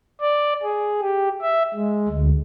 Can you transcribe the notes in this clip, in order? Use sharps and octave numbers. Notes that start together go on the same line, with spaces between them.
D5
G#4
G4
E5
G#3
D2